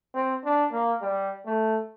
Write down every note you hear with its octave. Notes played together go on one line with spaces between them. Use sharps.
C4
D4
A#3
G3
A3